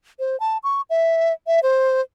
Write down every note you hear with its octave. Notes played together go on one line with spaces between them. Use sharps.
C5
A5
C#6
E5
E5
C5